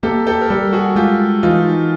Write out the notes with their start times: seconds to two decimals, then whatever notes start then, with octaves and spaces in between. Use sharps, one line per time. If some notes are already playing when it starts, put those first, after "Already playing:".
0.03 A#3 G4 A4
0.27 G4 A4
0.41 A#4
0.49 G3 G4 A4
0.73 F#4 G#4
0.96 G#3 F4 G4
1.43 E3 D#4 F4